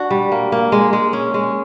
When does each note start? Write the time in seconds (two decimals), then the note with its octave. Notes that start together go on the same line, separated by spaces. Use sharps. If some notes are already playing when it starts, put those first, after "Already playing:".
Already playing: D4 F#4
0.11 G3
0.32 A#3
0.52 A#3
0.72 G#3
0.93 G#3
1.13 C#4
1.34 G#3